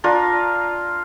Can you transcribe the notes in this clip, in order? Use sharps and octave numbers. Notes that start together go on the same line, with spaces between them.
D4 F4 A#4